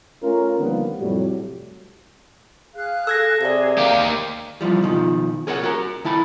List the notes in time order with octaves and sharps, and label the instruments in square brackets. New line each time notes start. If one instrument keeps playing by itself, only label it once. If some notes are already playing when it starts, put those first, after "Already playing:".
[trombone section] A3 C#4 F4 A#4
D3 D#3 F3 G3 A#3 B3
F2 A2 C3 F#3 G3
[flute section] G#4 F5 F#6
[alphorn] A4 [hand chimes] E6 G#6 A#6
[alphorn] C3 [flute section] G#4 [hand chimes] D5 G#6
[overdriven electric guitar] A#3 G4 [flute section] A#4 F5 A#5
[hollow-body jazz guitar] G2 E3 F3 G3
B2 D#3 F3
G#4 A#4 C#5 F5 F#5
F#4 A#4
D#3 E4 A5 B5